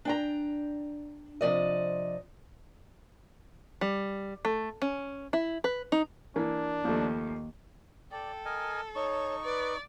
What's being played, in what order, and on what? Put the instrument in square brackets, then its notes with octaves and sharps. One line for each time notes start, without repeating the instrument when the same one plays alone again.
[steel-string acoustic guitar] D4 G5 A#5
C3 F3 D5 D#5
[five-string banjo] G3
A3
C#4
E4
B4
D#4
[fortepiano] E3 A#3 [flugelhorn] D4
[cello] D#2 [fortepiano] F3 A3
[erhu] A4 [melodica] D5 [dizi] G5
[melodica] A#4 D#5 G#5
[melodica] D#4 C#6 [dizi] C#5
[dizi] B4 [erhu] D5